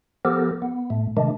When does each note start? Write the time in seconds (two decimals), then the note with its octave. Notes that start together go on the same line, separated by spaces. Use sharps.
0.25 F3 B3 G4 A4 A#4
0.62 B3
0.90 A2 A3
1.17 C3 D#3 G#3 A3 D4